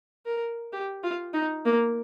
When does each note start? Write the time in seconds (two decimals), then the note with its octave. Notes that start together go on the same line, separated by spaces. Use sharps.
0.26 A#4
0.73 G4
1.03 F4
1.34 D#4
1.65 A#3